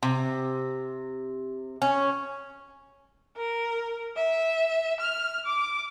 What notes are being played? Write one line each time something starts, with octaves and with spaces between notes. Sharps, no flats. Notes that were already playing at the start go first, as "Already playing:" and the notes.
C3
C#4
A#4
E5
F6
D6